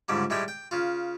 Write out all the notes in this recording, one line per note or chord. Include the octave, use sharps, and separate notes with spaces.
C#2 G#2 D3 G3
A2 G3 G#3 G5
G5
C#3 F4